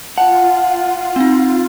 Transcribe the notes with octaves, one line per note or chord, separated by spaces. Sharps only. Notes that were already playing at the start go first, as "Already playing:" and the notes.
F4 F#5 A5
C4 D#4